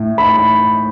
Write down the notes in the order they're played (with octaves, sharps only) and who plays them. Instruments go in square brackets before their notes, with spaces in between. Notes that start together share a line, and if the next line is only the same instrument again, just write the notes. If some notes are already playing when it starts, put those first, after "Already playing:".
Already playing: [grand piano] A2
B5